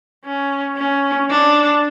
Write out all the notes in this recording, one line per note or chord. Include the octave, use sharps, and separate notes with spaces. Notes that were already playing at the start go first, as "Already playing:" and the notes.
C#4
C#4
D4